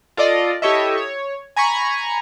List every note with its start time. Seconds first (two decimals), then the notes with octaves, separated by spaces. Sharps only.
0.17 F4 A4 D5 D#5
0.62 E4 G4 A4 C#5 D#5 E5
0.98 C#5
1.57 G#5 A#5 B5 C#6